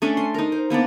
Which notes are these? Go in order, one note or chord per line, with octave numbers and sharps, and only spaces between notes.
A3 C#4 D4
C6
D#4 A#4
C5
A#3 B3 D4 D5